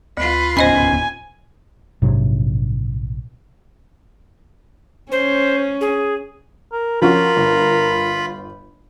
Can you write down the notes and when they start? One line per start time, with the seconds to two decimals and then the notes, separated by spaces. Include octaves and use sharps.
0.17 D2 F4 B4
0.57 D1 B3 C#4 C5 D#5 G#5 B5
2.02 A#1 G#2 C3 F#3
5.12 C#4 C5
5.81 G#4
6.72 A#4
7.02 F3 C#4 F4 F#4 A#4 B5
7.36 G1